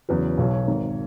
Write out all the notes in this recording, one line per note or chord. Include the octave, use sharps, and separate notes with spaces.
E2 C#3 F#3 B4
B1 B2 F#3 C#5
C#5
G#1 G#2 D#3